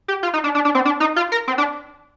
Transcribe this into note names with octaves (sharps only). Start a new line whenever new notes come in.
G4
F4
D#4
D4
D4
D4
C4
D4
D#4
F4
A#4
C4
D4